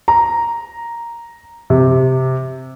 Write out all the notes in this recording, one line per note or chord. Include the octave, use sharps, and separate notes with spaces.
A#5
C3